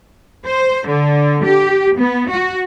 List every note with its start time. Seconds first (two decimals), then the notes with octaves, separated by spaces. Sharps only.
0.46 C5
0.86 D3
1.43 G4
1.98 B3
2.29 F#4